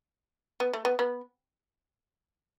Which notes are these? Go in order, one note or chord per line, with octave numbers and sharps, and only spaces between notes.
B3
A3
B3
B3